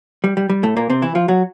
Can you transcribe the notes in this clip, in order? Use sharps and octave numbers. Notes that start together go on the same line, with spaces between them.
G3
G3
G3
A2 A3
A#2 A#3
C3 C4
E3 E4
F3 F4
F#3 F#4